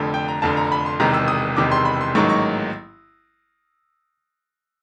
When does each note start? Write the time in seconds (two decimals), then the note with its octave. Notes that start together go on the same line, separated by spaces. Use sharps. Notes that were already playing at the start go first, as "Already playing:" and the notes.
Already playing: F1 F2 D3
0.14 G5
0.28 A#5
0.42 F1 F2 D3 A5
0.57 A#5
0.72 B5
0.86 C6
1.00 E1 E2 C3 D#3 A#5
1.14 E6
1.28 D#6
1.57 E1 E2 C3 D#3 D6
1.72 C6
1.85 B5
2.01 C6
2.15 A1 G#2 D#3 F#3 A#3 C#6
2.29 C#6